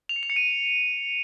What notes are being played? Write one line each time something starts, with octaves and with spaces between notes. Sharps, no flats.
F7
C#7
F7
C#7
D#7